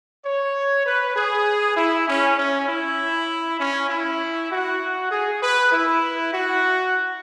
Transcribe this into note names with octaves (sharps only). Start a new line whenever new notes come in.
C#5
B4
G#4
E4
C#4
C#4
E4
C#4
E4
F#4
G#4
B4
E4
F#4